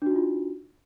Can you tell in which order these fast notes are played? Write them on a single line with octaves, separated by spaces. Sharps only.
D4 F#4 D#4 F4